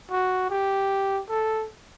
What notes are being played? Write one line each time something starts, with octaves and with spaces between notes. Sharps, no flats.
F#4
G4
A4